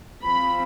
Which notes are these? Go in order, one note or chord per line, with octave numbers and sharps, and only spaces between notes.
F3 C4 B5